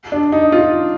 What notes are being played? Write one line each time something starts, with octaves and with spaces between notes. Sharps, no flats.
D4
D#4
F4